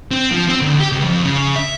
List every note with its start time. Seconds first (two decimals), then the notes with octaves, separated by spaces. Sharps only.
0.11 C4
0.32 F3
0.49 C4
0.62 D2
0.80 G4
0.92 C#2
1.04 F2
1.25 C#3
1.56 E5